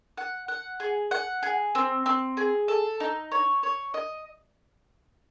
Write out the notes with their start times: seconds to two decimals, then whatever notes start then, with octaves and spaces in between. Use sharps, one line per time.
0.18 F#5
0.48 F#5
0.80 G#4
1.11 F#5
1.43 G#4
1.75 C4
2.06 C4
2.37 G#4
2.68 A4
3.00 D#4
3.32 C#5
3.63 C#5
3.94 D#5